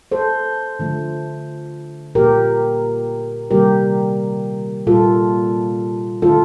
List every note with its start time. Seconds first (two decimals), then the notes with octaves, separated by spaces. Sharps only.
0.12 A4 C5
0.79 D3 F3 A3
2.15 A#2 F3 A#3 G4 A#4
3.51 C3 D#3 G3 A#3 G4 A#4
4.87 A#2 G3 A#3 F4 A4
6.22 D3 A3 F4 A4